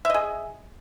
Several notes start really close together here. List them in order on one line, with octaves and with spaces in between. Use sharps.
E5 D#5 G#4